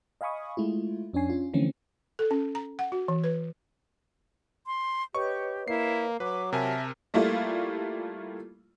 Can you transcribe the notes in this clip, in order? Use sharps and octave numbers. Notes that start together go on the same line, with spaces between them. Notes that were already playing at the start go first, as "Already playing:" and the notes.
D#5 F5 G#5 B5 C#6 D#6
G#3 A3 E4 F4
F2 C#4 D4 C#5 G#5 C7
C#4 F4
D3 E3 F3 A3 C4 C#4
A4
C#4
A#5
F#5
F#4
E3
B4
C6
G4 B4 C#5 D#5 C#6
A#3 E4 C7
F#3 B4 D6
C3 G4 A#4 E5 G#5 A5
G3 A3 A#3 E4 F4